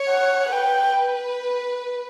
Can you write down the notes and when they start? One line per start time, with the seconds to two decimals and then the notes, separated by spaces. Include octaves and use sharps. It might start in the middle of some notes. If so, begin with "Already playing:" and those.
Already playing: C#5
0.10 F#5
0.52 B4 G5